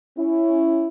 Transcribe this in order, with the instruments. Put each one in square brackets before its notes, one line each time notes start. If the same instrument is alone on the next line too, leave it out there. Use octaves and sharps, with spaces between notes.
[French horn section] C#4 E4